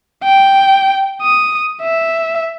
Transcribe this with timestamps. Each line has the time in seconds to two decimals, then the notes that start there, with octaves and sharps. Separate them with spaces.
0.24 G5
1.22 D#6
1.82 E5